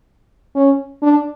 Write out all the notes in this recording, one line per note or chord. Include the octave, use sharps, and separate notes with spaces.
C#4
D4